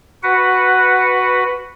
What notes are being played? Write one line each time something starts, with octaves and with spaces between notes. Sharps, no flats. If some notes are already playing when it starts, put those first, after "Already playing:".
F#4 B4 F#5